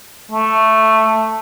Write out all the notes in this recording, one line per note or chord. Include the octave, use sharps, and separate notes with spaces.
A3